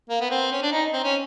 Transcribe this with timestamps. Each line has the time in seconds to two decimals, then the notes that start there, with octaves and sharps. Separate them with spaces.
0.10 A#3
0.21 B3
0.31 C4
0.52 C#4
0.62 D4
0.72 D#4
0.93 C4
1.04 C#4